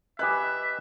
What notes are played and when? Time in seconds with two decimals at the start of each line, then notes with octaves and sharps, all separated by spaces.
0.19 G4 B4 D#5 E5 G#5 F#6